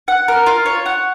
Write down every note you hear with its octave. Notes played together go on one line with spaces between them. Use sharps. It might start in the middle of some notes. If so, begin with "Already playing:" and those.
F#5
A#4
F4
C#5
F#5